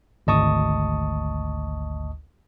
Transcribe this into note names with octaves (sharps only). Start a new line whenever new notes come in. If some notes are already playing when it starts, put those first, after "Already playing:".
G#1 D2 D#5 A5 C#6 D#6